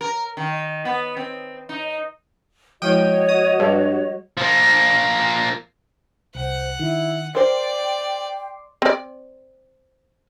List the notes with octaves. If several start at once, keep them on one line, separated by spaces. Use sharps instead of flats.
A#4
D#3
B3
C4
D#4
F3 G#3 E4 F#4 C#5 D#5 G5 D#7
D#6
G2 G3 G#4
F3 A#3
C2 C5 F#5
D#3 E4
A#4 C5 D5 G5 C6 D6 C7
C4 D5